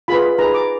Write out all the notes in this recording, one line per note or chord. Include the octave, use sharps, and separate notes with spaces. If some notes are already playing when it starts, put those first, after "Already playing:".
F4 G#4 B4 B5
D#4 G#4 B4 A#5
D6